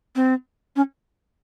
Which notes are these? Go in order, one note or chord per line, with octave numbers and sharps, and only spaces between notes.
C4
C#4